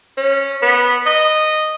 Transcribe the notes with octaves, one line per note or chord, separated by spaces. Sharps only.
C#4
B3
D#5